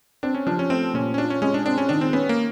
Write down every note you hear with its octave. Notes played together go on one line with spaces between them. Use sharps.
C4 D4
C#4
F3 D4
C#4
A3 C4
A#2 C#4
C#4
D4 F4
C#4
G#3 C#4
D4
C4 D4
C#4
D#3 D4
C4
B3 C#4
A#3